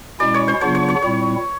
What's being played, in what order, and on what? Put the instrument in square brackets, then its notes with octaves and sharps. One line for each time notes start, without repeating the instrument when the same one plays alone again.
[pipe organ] B2 G#3 C#4 E4 [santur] D5
[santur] C#5
C5
[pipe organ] C#3 F#3 B3 D4 F4 [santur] C#5
[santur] C#5
C#5
[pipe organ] A#2 G3 C4 E4 [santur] C#5